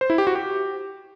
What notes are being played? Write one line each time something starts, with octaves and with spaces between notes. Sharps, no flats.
C5
E4
G4
F#4
G4